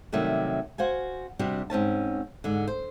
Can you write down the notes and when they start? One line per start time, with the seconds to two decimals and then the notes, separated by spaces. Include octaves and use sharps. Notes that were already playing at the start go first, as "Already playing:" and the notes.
0.12 C3 D#3 F#3 G3 A3 D4
0.78 F#4 C5 F5 G#5
1.39 C3 G3 D4 F#4 G4
1.70 G#2 C4 C#4 A5
2.44 G#2 D3
2.67 C5